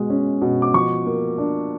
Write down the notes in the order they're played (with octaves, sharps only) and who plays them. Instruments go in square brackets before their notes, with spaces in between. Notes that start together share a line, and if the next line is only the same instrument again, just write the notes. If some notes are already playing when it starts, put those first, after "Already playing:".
Already playing: [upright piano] B2 G#3
C#4
B2
D6
F3 C#6
A#3
D4